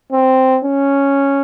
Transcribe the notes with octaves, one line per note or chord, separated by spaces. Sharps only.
C4
C#4